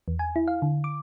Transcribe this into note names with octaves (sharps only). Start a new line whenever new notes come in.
E2
G#5
E4
F5
D3
D6